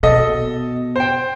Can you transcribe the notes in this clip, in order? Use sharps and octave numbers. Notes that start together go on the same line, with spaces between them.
B2 A4 D#5
C5 G5